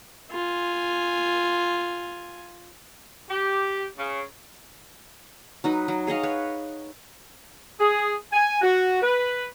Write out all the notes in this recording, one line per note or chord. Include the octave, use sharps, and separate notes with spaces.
F4 G#5
G4
C#3
F#3 D#4 B4
F#3
G#4 C#5 D#5 F5
B4 C#5
G#4
G#5
F#4
B4